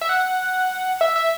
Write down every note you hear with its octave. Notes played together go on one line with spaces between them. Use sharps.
E5
F#5
E5
E5